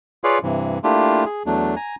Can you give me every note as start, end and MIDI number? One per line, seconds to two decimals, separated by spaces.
0.24 0.39 65
0.24 0.39 68
0.24 0.39 71
0.24 0.39 73
0.24 0.39 74
0.24 0.39 77
0.43 0.79 43
0.43 0.79 48
0.43 0.79 52
0.84 1.25 57
0.84 1.25 58
0.84 1.25 62
0.84 1.25 64
0.84 1.25 65
0.84 1.25 67
1.25 1.43 68
1.46 1.75 40
1.46 1.75 54
1.46 1.75 57
1.46 1.75 62
1.76 1.96 80
1.76 1.96 82